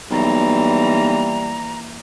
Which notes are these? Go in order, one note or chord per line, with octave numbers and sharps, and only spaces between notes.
B1 E3 G3 A#3 A#5